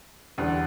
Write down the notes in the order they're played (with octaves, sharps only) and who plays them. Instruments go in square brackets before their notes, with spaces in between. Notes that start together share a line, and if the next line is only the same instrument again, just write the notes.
[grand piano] E2 D3 G3